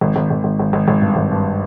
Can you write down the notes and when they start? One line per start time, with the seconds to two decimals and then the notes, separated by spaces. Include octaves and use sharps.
0.01 G#1
0.16 G#1
0.30 G#1
0.44 G#1
0.59 G#1
0.73 G#1
0.88 G#1
1.02 G2
1.16 G#1
1.31 G2